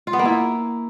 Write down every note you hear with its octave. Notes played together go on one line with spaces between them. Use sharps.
F4
B3
A#3
E4